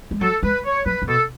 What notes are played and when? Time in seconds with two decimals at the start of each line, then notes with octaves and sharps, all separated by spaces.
0.11 G#3
0.21 F#3 A4
0.43 G#3 B4
0.65 C#5
0.85 F#3 B4
1.02 C#3
1.07 B2 A4